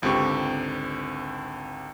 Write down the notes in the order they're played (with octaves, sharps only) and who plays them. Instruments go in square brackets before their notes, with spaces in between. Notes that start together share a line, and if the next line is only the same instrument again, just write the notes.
[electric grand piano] G#1 C#2 D3 C4 G4 C#6